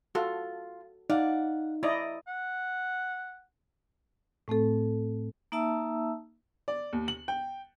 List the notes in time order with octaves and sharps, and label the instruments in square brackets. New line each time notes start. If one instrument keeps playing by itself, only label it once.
[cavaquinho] F4 [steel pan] F#4 A4
[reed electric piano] D#4 [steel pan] D5 [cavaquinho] F5 F#5
[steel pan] E4 D5 D#5 [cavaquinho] A#5
[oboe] F#5
[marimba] A2 A3 C4 A4
[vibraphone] A#3 D#4 E5 A5 E6
[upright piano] D5
D#2
F#7
G5